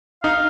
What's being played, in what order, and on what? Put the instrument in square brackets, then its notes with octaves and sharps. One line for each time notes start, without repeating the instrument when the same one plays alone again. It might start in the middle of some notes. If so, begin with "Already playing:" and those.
[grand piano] D#4 [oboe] F5